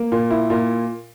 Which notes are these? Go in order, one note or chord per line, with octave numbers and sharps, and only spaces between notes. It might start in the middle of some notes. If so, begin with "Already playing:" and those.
Already playing: A#3
A#2
E4
A#2